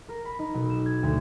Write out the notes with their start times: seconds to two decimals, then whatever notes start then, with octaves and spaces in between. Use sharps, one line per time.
0.08 A#4
0.25 B5
0.39 D#4
0.54 B1
0.70 E7
0.86 G#6
1.03 D2